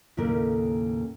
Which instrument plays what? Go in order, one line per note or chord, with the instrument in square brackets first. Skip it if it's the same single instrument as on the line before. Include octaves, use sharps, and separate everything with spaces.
[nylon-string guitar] D#2 A2 C#3 A3 A#3 A#4